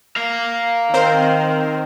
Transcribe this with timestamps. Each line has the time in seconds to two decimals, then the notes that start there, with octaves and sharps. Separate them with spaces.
0.16 F5 A#5
0.94 D#3 C4 A#4 C5